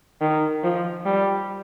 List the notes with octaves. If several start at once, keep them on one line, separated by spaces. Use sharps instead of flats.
D#3
F3
G3